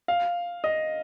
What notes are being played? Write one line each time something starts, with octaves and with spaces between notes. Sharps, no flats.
F5
D#5